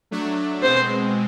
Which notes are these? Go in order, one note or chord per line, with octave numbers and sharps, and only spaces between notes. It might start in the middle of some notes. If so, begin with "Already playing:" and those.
F#3 A3 D4
B2 G#3 C4 C5